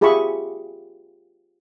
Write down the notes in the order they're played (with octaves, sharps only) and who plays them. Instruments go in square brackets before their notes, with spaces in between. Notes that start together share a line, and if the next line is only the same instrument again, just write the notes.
[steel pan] F4 G4 G#4 E5 B5 C#6